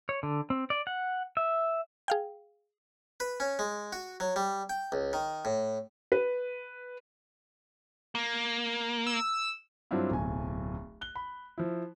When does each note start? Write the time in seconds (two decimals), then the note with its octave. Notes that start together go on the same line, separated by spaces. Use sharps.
0.09 C#5
0.23 D3
0.50 C4
0.70 D5
0.87 F#5
1.37 E5
2.08 G#4 F5 G5
3.20 B4
3.40 C#4
3.59 G#3
3.93 F#4
4.20 F#3
4.36 G3
4.70 G5
4.92 C#2
5.13 D#3
5.45 A2
6.12 B4
8.15 A#3
9.07 E6
9.91 G2 F#3 C4 D4 E4 F4
10.10 D1 B1 G#5
11.01 F#6 G7
11.16 B5
11.58 F3 E4